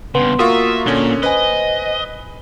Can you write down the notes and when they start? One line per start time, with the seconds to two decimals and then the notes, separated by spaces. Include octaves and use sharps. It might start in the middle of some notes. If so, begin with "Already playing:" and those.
0.15 G2 C#3 B3 C6
0.39 A#3 F4 F#4 A#4 E5 C#6 D#6
0.86 A#2 D3 C#4
1.23 B4 C5 D#5 G#5